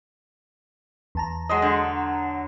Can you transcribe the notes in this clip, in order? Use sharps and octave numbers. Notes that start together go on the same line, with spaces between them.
E2 A5 A#5
F#3 G#3 D#5
D3